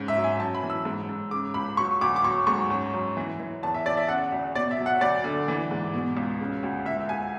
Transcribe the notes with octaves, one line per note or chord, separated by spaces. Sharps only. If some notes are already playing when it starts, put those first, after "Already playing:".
Already playing: G#2 C#3
E5
F#3
G#5
F#2 A5
B5
E3
E6
G#2
G#2
C#3 D6
C#2 B5
F#3 C#6
D2 D6
D6
F#3 C#6
G#2 C#6
F#2
F#2
E3
E3
E2 A5
E5
E2 D5
E5
C#3 F#5
D2
B2 D5
E5
F#3
F#5
D2 D5
D3
E3
G#2
B2
C#2
C#3
D2
C#2 E5
C#2 G#5